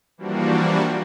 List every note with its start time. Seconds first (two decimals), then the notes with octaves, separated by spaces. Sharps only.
0.18 E3 F3 G3 A#3 D4 F#4